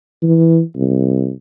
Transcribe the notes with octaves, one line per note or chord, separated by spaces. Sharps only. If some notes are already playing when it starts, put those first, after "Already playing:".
E3
C2